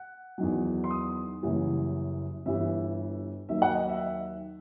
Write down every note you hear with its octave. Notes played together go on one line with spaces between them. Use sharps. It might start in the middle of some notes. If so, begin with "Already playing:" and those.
Already playing: F#5
E2 D#3 F#3
C6
D#6
F#1 F#2 E3 G3
G1 G2 E3 G3 E5
D#2 D#3 F#3 E5
F#5
D#5
E5